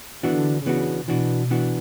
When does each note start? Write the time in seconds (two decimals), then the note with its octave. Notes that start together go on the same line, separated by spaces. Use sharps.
0.23 D3 E3 B3 D4 F#4
0.66 C#3 E3 B3 D4 F#4
1.08 B2 E3 B3 D4 F#4
1.51 E3 B3 D4 F#4